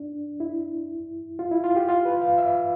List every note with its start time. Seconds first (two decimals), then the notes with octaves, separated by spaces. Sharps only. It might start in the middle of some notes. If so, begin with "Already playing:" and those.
Already playing: D4
0.40 E4
1.39 F4
1.51 E4
1.64 F4
1.76 G4
1.88 F4
2.05 B4
2.22 F5
2.38 E5